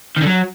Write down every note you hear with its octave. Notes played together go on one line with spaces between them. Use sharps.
D#3
D3
F#3